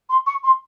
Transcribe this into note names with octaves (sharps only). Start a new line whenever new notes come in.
C6
C#6
C6